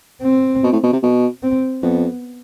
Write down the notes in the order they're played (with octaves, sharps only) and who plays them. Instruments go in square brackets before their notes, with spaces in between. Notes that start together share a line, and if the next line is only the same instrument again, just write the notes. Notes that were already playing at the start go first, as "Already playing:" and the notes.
[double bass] C4
[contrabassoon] B2
A2
B2
C3
B2
[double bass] C4
[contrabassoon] F2 [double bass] B3